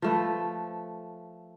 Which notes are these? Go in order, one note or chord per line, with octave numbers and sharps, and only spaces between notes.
F3 A3 B4